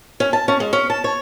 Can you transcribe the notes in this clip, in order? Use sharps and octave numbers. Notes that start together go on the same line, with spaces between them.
C#4
A5
C#4
G#3
C#4
A5
C#5